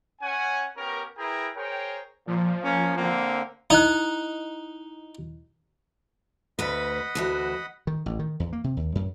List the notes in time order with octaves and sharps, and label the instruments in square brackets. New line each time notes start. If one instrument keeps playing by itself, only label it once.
[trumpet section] C#4 F#5 G#5
B3 C#4 G4 A#4
E4 G#4 A#4 B4 G5 A#5
G#4 A#4 C5 C#5 G5
[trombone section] A#2 [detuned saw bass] F3
[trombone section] A#3 C#4
D3 A#3 C4
[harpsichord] D#4 [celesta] E4 D#5 F#6
[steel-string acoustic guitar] D2 B4 [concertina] D#5 F#5 B5
[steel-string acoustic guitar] D2 E3 F#4
[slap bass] D#3
A1
D#3
E2
A#3
C3
D#2
F#2